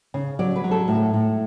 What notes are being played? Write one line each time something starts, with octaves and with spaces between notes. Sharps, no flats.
C#3
F#3 D5
B4
F#3
A4
A2
A2